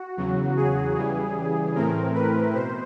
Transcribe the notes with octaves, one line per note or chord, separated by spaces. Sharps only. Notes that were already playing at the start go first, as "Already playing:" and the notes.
Already playing: F#4
E2 C#3 F#3
G#4
C#3 E3 G3
A2 E3 A3 C4 A#4
B4
B2 C5